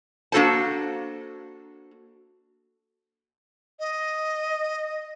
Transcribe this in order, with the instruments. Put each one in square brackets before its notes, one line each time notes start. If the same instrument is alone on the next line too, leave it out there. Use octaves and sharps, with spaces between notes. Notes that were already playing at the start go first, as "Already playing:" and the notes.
[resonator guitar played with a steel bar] A#3 D4 F#4 A4 C5 A5
[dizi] D#5